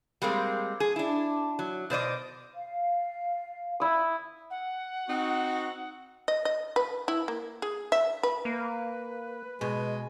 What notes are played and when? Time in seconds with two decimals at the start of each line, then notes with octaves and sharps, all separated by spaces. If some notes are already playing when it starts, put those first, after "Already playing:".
0.22 G3 G#3 A#3 C4
0.80 G#4
0.96 D4 E4
1.59 F#3
1.90 B2 C5 D5 D#5
2.54 F5
3.80 E4 D#6
4.50 F#5
5.09 C4 D#4 F#4
6.28 D#5
6.45 D#5
6.76 B4
7.08 E4
7.28 A#3
7.62 G#4
7.92 E5
8.23 B4
8.45 A#3 B4
9.61 B2 G#3